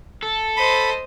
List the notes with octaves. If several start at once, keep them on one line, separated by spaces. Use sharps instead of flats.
A4
C5 D#5 B5